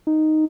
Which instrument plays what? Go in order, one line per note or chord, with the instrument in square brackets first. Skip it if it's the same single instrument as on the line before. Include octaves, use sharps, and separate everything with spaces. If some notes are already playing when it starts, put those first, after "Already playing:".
[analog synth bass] D#4